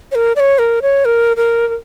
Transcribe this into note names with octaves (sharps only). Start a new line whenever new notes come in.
C#5
A#4
D5
C#5
A#4
C#5
A#4
A#4
A#4